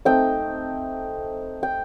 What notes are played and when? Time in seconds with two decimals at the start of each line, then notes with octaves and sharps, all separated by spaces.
0.05 A3 C4 D#4 D#5 G5
1.63 G5